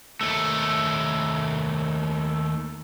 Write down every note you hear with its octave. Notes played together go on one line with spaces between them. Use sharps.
D#2 A3